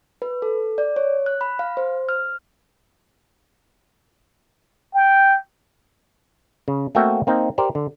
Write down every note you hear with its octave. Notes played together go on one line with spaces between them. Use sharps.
B4
A4
D5
C#5
F#6
B5
F5
C5
F6
G5
C#3
A3 A#3 C4 F#4 E5 G5
A#3 C4 D#4
G4 A#4 C5 D5
D3